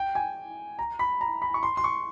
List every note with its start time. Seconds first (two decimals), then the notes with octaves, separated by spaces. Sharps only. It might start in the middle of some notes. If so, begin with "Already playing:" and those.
Already playing: G5
0.15 G#5
0.79 A#5
0.99 B5
1.21 A#5
1.42 B5
1.54 C#6
1.63 C6
1.77 C6
1.84 C#6